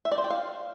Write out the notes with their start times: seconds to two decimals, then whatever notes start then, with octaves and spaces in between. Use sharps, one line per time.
0.05 E5
0.11 D5
0.18 C5
0.24 G5
0.30 F5